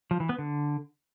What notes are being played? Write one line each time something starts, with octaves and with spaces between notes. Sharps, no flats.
F3
E3
B3
D3